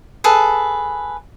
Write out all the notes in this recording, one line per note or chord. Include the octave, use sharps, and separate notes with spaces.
G#4 A4 B4